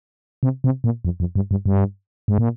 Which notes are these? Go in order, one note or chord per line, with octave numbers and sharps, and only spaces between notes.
C3
C3
A#2
F2
F2
G2
G2
G2
G#2
A#2